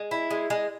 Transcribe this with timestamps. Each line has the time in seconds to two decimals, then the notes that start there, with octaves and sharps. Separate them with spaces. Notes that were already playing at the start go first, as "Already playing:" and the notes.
Already playing: G#3
0.11 E4
0.31 G#3
0.50 G#3